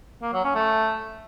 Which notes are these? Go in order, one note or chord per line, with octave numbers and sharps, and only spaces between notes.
A#3
F#3
C#4
A3